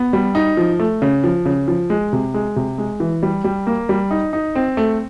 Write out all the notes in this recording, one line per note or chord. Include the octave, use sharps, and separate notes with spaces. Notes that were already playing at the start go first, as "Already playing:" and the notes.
Already playing: B3
G3
D#4
F3
A3
C#3
F3
C#3
F3
G#3
C3
G#3
C3
G#3
E3
G3
G3
A#3
G3
D#4
D#4
C4
A3